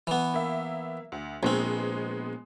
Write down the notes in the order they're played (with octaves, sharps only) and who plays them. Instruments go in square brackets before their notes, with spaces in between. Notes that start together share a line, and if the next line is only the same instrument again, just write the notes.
[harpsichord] E3 B3
[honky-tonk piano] A#3 E5
D2
[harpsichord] A#1 C4 [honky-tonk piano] G#3 B3 G#4